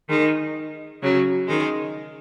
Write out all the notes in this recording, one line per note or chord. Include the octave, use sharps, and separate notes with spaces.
D#3 G#3
C#3 F#3
D#3 G#3